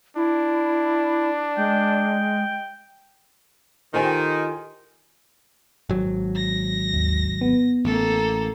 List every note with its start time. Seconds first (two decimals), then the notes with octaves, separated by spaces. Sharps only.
0.16 D4 E4
1.57 G#3 G5
3.94 D#3 F4 G4 A4 C5 G#5
5.89 G#1 F#3
6.36 A#6
6.94 D#2
7.41 B3
7.85 A1 A#3 A4